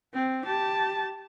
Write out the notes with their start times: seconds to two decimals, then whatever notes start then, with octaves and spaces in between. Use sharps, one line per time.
0.14 C4
0.45 G4 A5